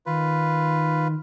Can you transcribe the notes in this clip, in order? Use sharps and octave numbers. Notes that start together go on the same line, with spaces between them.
D#3 F4 B4